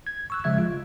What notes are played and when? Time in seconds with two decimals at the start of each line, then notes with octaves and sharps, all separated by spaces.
0.07 G#6
0.30 C#6 E6 F#6
0.44 C#3 F3 G#3 E5 G#6
0.58 F4